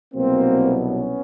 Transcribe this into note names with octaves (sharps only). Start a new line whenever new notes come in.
C2 B2 F#3 A#3 C4
B3 C#4